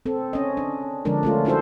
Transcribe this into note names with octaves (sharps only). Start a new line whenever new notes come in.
C4 A4
C#4 D#5
D4
D3 F3 G#3 D4 A#4
A3 C#4 F4
D4 E4 F#4 A4 C5